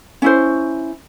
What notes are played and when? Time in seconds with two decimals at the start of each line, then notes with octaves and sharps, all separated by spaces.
0.22 C#4 E4 C5